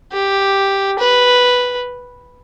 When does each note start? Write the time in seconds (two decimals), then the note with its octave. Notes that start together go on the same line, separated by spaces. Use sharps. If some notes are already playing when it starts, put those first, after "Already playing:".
0.13 G4
0.99 B4